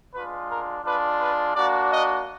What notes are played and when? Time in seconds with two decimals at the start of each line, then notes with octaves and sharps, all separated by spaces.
0.13 G#3 D4 F4 B4
0.49 A#4
0.84 G#3 D4 F4 B4
1.20 B4
1.55 A#3 D4 F#4 D5
1.91 D#5